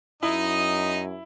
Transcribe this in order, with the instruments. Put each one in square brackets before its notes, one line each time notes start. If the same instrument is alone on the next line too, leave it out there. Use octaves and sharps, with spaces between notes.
[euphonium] F#2 [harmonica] D#4 D#5 [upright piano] E4